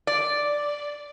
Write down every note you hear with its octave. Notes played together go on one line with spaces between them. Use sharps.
D5